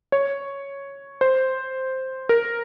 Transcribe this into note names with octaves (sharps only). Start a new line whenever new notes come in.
C#5
C5
A#4